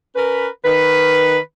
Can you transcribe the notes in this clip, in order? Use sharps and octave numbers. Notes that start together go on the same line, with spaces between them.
C#4 A#4 B4
D#3 B4